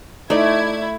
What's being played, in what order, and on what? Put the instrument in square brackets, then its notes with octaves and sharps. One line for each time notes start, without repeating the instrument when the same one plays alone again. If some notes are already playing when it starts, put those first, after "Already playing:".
[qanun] A3 [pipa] D#4 D5 [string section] E4 G#6